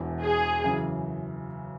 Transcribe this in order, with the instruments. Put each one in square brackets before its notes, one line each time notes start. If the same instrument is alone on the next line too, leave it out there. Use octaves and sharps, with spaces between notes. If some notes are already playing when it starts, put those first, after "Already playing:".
Already playing: [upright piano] E1 E2 E3
[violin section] G#4
[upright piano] F#2 C#3 E3